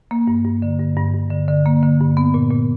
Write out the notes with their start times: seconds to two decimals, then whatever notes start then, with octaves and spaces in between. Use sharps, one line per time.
0.11 A#3
0.28 G2
0.45 G2
0.62 D3
0.80 G2
0.97 G2
1.14 G2
1.31 D3
1.48 D3
1.66 A#3
1.83 D3
2.00 G2
2.17 B3
2.34 A#2
2.51 A#2